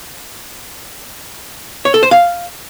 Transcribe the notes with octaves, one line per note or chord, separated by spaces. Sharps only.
C#5
A4
C5
F5